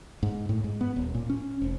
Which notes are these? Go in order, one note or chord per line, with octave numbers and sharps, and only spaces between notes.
G#2
A2
G#2
B3
D#1
A#2
C#4
F1